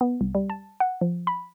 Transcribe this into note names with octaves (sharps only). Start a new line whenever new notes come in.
B3
C2
G3
A5
F#5
F3
B5